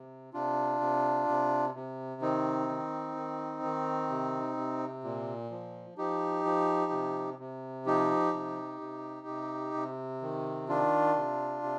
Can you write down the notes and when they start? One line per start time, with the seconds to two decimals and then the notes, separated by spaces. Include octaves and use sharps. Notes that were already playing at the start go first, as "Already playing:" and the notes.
Already playing: C3
0.33 C3 D4 F4
0.80 C3
1.28 C3
1.75 C3
2.21 D#3 C4 D#4
2.69 D#3
3.16 D#3
3.63 D#3
4.10 C3
4.57 C3
5.04 A#2
5.51 F3
5.98 F3 D#4 G4
6.45 F3
6.92 C3
7.39 C3
7.86 F3 D#4 G4
8.34 C3
8.81 C3
9.28 C3
9.74 C3
10.22 D#3
10.69 D#3 D4 F4
11.16 C3
11.63 C3